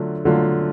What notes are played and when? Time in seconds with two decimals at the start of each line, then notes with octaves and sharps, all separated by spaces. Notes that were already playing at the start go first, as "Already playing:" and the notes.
Already playing: D3 F#3 A3 F4
0.25 D3 F#3 A3 F4